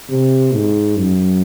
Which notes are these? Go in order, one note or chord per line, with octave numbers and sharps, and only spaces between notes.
C3
G#2
F#2